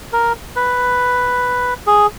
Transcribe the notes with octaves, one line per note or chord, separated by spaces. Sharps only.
A#4
B4
G#4